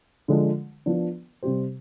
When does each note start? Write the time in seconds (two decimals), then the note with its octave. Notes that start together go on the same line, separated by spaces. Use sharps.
0.28 D3 F3 G#3 D4
0.86 F3 B3 D4
1.42 C3 G3 C4 G4 C5